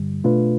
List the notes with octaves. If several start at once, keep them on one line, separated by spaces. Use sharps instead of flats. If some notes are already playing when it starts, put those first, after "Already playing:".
Already playing: G2 D3 G3
B2 A3 D4 F4 B4